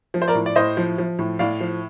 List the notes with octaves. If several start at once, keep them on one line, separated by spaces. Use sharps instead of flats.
F3
C5
A#4 D5
A2
D5
A2 C5 D#5
F3
F3
A2
A2 D5 F5
F3